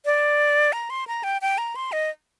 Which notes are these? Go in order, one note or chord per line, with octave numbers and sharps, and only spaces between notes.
D5
A#5
C6
A#5
G5
G5
A#5
C6
D#5